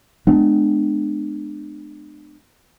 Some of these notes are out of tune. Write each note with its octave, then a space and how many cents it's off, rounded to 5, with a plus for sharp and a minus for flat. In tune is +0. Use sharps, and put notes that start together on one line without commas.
G#3 +35 B3 +35 D4 +35